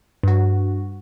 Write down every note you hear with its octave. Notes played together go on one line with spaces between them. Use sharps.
G2 F#4